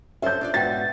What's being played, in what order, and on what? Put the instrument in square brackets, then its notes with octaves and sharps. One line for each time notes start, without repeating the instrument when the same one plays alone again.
[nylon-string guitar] C#4 A4 C5 [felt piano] E5 G6
[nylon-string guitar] D4 F4 D5
[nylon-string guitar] G#2 B3 F#4 [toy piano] D5 G5 [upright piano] A6